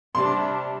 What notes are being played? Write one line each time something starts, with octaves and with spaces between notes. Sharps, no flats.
C3 G3 D4 C6